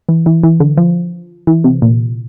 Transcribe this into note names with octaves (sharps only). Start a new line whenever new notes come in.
E3
E3
E3
D3
F3
E3
C3
A#2